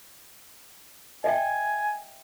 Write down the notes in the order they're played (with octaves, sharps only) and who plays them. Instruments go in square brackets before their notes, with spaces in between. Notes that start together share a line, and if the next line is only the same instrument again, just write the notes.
[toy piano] D#5 E5 G5 [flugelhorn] G#5